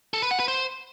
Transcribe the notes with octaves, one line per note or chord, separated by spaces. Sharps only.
A4
B4
F#5
B4
C5